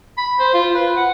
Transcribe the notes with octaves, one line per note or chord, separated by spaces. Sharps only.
B5
C5
F4
B4
F#5